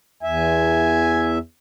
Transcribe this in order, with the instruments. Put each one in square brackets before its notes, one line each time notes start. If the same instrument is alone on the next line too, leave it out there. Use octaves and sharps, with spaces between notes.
[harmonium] E2 E5 [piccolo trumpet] G#5